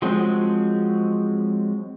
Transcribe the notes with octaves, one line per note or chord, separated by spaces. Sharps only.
F3 F#3 G#3 C4